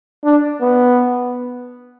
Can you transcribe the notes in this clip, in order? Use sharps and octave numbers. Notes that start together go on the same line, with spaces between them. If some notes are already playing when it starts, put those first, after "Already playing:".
D4
B3